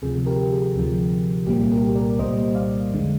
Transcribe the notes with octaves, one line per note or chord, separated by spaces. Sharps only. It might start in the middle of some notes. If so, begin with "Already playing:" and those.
D2 C3 F3 G#4
G4 A#4
G#4
D2 C3 F3
C2 A#2 G3 A#3 G4
G4 A#4
A#4 D5
C2 A#2 G3 A#3 C5 D#5
D5 F5
F2 D3 G#3